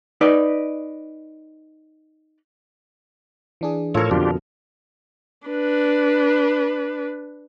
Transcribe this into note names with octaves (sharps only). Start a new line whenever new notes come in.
D#4 B4 D5
E3 D4 G#4
A2 F3 A4 A#4 C#5
F2 B2 D3 D4 F4 G4 F6
D4 B4